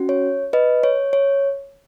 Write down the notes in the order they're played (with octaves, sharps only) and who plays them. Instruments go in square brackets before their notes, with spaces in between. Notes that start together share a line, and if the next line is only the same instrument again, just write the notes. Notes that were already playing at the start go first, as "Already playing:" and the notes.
Already playing: [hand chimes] C#4 F#4
C#5
B4 D#5
C#5
C#5